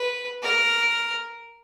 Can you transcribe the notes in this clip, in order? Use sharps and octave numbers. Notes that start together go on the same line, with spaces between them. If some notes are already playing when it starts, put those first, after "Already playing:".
Already playing: B4
A#4